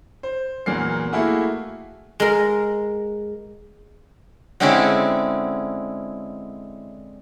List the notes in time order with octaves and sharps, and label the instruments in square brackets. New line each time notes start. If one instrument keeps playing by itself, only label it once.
[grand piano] C5
E2 A#2 F#3 A#4 C7
A3 A#3 E4 F#4 G#4
[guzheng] G#3 A#4
[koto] D3 G#3 C4 C#4 E4 D5